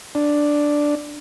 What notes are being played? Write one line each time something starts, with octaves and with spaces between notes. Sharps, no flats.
D4